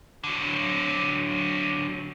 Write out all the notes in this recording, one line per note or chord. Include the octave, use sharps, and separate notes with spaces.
D3 F#3